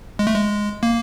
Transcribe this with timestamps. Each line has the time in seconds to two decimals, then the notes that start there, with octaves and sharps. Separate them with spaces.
0.19 G#3
0.27 A3
0.34 G#3
0.83 A#3